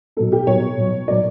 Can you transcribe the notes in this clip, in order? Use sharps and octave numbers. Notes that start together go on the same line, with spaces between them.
B2 F#3 B3 A4
G4
B2 F#3 B3 C#5
B2 F#3 B3
B2 F#3 B3 D5